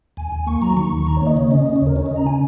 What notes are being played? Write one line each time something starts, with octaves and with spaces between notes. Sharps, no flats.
D#2 G#5
D#2
A#3 C#6
F#3 A#5
D#3 C#6
D#2
D#3 A#5
A#3 C#5
D#5
C#3 C#5
C#4 D#5
C#3 D#5
C#5
D#2
A#4
C#4 C#5
D#5
C#3
A#5
C#4 G#5